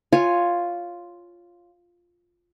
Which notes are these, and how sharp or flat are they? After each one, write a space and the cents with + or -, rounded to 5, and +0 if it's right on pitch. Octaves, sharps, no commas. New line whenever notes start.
F4 +0 C#5 +0 G#5 +0